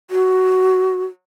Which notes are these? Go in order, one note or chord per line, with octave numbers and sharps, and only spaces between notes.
F#4